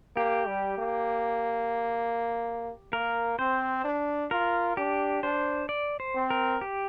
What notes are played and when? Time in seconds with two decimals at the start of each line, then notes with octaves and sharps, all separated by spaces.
0.16 A#3 G4
0.48 G3
0.79 A#3
2.93 A#3 A#4
3.39 C4 C5
3.85 D4
4.31 F4 A#4
4.77 D4 G4
5.23 D4 C5
5.69 D5
6.00 C5
6.15 C4
6.30 A#4
6.61 G4